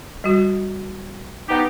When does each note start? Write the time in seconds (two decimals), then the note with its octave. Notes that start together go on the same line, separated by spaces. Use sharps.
0.24 G3 F#4
1.49 B3 D#4 G4